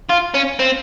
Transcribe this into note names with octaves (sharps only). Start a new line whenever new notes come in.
F4
C#4
C4